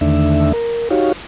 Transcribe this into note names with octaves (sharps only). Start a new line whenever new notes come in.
E2 D3 D#3 A3 D4 E5
A#4
D#4 F#4 G4 C#5 F5